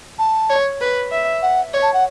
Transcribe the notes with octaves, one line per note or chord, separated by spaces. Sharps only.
A5
C#5
B4
E5
F#5
C#5
A5
F#5